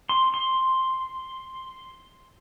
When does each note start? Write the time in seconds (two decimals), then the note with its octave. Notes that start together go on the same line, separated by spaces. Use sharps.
0.09 C6
0.34 C6